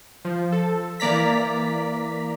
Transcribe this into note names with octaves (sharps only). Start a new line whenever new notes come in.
F3
A4
E3 A#3 D5 A#5 B6